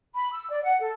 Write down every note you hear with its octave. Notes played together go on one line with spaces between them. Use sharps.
B5
E6
D5
F#5
A4